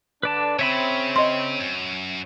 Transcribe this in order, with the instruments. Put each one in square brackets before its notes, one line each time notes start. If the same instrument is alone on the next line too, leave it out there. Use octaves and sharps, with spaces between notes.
[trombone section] D3 D4 [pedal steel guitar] B4 D5 A5
[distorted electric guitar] C#3 [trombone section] C4 [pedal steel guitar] C#5 E5 B5
[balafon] D#5 C6
[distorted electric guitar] F#2